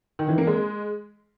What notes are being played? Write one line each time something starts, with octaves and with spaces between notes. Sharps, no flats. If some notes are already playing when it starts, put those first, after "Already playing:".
D#3
E3
A#3
G#3